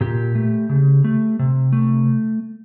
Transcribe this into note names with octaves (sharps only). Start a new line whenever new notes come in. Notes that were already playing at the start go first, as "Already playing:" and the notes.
A#2 G4
A3
C#3
A3
C3
A3